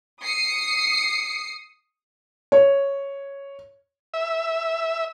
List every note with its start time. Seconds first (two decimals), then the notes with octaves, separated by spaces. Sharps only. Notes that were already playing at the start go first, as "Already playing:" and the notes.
0.22 D#6 C7 C#7
2.52 C#5
4.14 E5